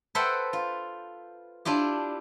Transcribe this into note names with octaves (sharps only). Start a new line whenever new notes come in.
A4 B4 C5 E5 F#5 G5
F4
D4 E4 F4 G4